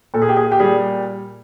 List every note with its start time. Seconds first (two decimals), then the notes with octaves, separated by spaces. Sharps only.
0.14 A#2 A4
0.22 G#4
0.29 G4
0.37 G#4
0.52 G4
0.59 G3 G#4